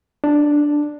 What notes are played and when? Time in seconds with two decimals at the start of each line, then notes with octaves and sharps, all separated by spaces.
0.24 D4